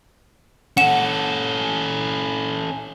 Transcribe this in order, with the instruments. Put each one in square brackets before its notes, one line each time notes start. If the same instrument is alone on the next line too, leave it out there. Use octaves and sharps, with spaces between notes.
[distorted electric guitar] C#4 A4 [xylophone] F#5 E7